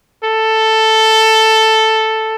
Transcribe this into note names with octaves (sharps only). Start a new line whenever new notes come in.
A4